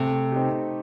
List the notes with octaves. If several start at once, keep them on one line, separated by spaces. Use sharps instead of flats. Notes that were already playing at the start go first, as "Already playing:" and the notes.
Already playing: C3 A3
C4 D#4 G4